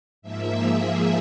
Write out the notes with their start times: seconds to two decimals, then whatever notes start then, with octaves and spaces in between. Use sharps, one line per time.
0.22 G#2 F3 A#3 E5
0.62 G#4